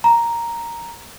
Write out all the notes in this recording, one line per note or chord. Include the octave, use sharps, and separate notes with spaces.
A#5